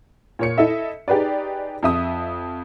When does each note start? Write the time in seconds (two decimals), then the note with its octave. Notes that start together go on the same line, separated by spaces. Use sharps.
0.39 A#2 C#5 C#7
0.58 E4 A4 D#5 E5
1.08 D#4 G4 G#4 B4 D5
1.83 F2 E5 D#6